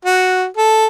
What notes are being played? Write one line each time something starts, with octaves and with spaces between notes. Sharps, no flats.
F#4
A4